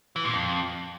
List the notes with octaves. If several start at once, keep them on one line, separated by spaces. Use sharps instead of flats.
E3
A#2
F2